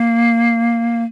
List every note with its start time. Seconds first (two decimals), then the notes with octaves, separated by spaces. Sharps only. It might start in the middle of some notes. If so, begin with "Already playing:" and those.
Already playing: A#3